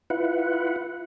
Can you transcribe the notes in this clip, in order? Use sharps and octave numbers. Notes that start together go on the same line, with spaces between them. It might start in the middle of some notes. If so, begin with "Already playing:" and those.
E4 F4 B4 F#5